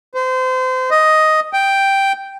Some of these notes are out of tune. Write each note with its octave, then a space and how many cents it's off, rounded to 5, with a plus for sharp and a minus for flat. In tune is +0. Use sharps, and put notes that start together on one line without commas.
C5 -30
D#5 +5
G5 +0